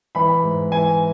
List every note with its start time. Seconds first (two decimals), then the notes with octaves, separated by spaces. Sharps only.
0.15 E3 B5
0.43 G#2
0.71 E3 G#5